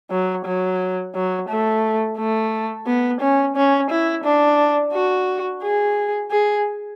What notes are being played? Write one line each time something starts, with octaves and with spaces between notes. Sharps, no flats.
F#3
F#3
F#3
A3
A3
B3
C#4
C#4
E4
D4
F#4
G#4
G#4